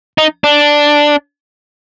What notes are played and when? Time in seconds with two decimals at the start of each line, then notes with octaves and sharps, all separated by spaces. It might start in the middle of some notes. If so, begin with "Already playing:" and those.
0.18 D#4
0.44 D4